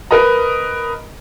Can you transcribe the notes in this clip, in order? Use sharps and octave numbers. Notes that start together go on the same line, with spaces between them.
A#4 B4 D#5 A#5